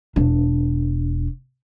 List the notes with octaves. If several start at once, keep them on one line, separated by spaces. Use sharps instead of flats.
E1 D4